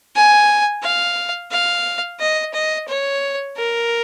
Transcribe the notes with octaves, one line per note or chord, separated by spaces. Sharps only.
G#5
F5
F5
D#5
D#5
C#5
A#4